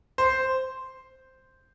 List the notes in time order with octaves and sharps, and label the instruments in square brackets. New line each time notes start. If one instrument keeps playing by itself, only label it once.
[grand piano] C5